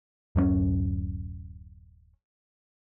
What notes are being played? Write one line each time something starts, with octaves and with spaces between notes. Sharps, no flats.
D1 F#2 A3 C#4